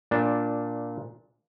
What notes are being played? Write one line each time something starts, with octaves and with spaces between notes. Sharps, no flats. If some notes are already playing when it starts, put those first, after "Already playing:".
A#2 D4 A5